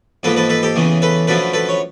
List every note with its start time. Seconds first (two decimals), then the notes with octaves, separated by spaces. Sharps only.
0.23 G#2 F3 A#3 A4 B4
0.37 A4 B4
0.49 A4 B4
0.63 G4 A4
0.76 E2 C#3 E3 A3
1.02 A4 B4
1.27 F#2 D3 F3 A3 A4 B4
1.54 A4 B4
1.69 C#5